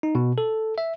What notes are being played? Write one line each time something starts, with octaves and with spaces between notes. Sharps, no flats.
D#4
B2
A4
E5